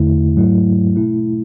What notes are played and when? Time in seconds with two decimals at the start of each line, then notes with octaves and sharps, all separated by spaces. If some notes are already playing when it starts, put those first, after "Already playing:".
Already playing: E2 D3 A3 E4
0.36 G#2 F#3 A3 E4
0.96 B2 A3 E4